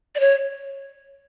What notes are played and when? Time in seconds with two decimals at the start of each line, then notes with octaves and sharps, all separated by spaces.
0.15 D5
0.20 C#5